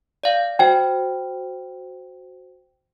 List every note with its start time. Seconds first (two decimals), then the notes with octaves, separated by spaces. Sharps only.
0.24 D5 F5
0.59 F#4 C5 G5